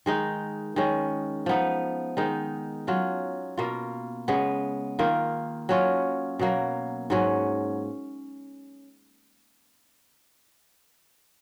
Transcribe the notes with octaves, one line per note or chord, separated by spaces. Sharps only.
D#3 G#3 D#4
D#3 G#3 C#4
F3 B3 D#4
D#3 G#3 D#4
F#3 C#4 F4
B2 A#3 F4
C#3 G#3 B3
D#3 A#3 F4
F#3 C#4 F4
B2 F#3 A#3
G#2 F#3 C#4